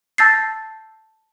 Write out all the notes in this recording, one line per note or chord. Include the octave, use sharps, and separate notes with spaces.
A5 E6 G6 A6 A#6 C7